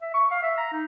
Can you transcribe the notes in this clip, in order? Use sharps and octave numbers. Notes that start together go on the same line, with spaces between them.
E5
C#6
F5
E5
A#5
D#4